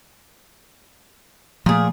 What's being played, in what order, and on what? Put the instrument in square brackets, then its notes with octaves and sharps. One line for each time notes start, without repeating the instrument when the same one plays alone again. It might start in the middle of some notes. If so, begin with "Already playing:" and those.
[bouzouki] A#2 G#4 [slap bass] F3 A3